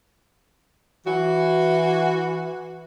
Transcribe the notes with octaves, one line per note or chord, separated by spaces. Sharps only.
E3 F#4